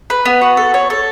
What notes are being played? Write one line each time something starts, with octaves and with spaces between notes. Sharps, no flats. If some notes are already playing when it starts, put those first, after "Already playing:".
B4
B3
F#4
A4
C#5
A4